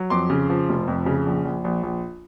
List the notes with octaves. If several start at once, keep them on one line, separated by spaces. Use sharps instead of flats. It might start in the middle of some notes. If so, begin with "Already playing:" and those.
Already playing: F#3
F2 C6 D6
C#3
F3
F1
F2
C#3
A#1
A#1
A#1
A#1